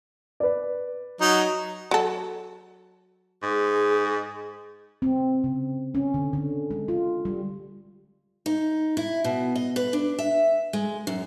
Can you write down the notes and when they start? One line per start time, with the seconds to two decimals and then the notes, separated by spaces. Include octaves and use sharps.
0.40 B4 D5
1.21 F#3 D#4
1.91 F#3 A4
3.43 G#2 G#4
5.02 C4
5.44 C#3
5.95 C#4
6.14 D3
6.33 D3
6.71 G#3
6.88 F4
7.25 G3
8.46 D#4
8.97 E4
9.24 B2
9.56 D#5
9.76 B4
9.93 D4
10.19 E5
10.73 G#3
11.07 F#2